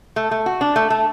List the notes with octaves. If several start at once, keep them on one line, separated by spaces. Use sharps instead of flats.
A3
A3
F#4
D4
A3
A3